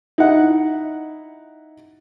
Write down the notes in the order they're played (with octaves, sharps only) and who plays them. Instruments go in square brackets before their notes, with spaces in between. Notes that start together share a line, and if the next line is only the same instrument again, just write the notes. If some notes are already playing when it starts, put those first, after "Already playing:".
[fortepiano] D#4 E4 F#5